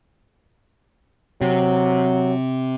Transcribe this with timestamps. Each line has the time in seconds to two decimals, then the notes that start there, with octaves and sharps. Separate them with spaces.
1.41 C3 F#3